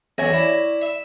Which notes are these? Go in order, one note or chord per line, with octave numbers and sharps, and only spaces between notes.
B1 E2 C#5 E5 G#5 A#6
E4 D5
E5